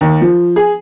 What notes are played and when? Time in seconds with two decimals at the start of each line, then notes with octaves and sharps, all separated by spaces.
0.01 D#2
0.21 F3
0.56 G#4